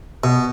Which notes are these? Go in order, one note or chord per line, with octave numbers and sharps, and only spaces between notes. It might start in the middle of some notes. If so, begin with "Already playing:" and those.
B2